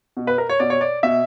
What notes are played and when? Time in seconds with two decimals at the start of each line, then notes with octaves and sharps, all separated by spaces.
0.17 B2
0.27 B4
0.38 A#4
0.49 C#5
0.60 B2 D5
0.70 C#5
0.81 D5
1.03 B2 E5